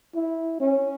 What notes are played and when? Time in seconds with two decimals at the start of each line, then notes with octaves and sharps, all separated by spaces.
0.15 E4
0.60 C#4